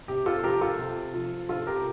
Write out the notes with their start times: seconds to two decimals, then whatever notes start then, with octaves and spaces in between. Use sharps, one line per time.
0.08 C3 G4
0.26 F4 A4
0.43 F3 G4 A#4
0.61 F4 A4
0.78 C3
1.14 F3
1.49 C3 F4 A4
1.67 G4 A#4